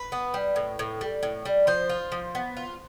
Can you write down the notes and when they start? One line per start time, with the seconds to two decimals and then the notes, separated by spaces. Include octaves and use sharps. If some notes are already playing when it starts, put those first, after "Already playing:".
Already playing: B4
0.12 B3
0.34 G3
0.56 A2
0.79 A2
1.01 G3
1.23 A2
1.45 G3
1.67 F3 C5
1.89 F4
2.12 F3
2.35 B3
2.57 F4